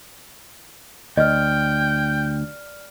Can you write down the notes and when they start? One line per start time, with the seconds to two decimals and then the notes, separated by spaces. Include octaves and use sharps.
1.17 D2 D5 D#5 G5 F6